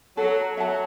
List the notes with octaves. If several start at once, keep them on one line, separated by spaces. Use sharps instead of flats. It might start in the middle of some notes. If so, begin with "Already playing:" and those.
F#3 A4
F#3 E5 A5